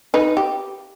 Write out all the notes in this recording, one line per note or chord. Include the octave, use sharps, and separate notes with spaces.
D#4 B4
G4